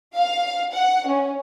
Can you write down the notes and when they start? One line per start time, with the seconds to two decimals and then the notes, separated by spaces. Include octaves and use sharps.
0.16 F5
0.74 F#5
1.07 C#4